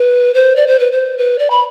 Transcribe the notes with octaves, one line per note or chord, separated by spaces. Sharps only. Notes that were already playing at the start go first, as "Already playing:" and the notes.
Already playing: B4
C5
D5
C5
B4
C5
B4
D5
B5